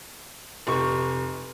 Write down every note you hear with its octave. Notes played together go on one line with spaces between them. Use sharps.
F1 G4 C#6